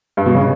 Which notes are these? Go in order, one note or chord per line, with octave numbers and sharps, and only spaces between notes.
G2
B2
C#3